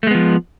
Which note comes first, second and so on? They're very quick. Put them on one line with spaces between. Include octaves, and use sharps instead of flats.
A3 G#3 B3 F3